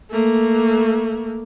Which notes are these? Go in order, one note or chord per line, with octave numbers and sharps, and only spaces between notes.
A3 A#3